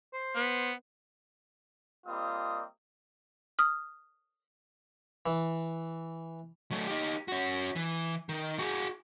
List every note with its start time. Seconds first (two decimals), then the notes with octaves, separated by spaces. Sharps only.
0.14 C5
0.36 B3
2.07 G3 A#3 C4 F4 D#5 D#6
3.59 D#6 F6
5.26 E3
6.71 F#3 A3
6.88 D#4 G4
7.28 C#4 F#4
7.76 E3
8.29 D#3
8.59 F#4 G#4